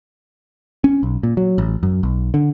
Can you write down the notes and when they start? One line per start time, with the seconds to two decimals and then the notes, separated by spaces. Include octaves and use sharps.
0.84 C#4
1.03 B1
1.23 A#2
1.37 F#3
1.58 A1
1.83 F#2
2.03 B1
2.34 D3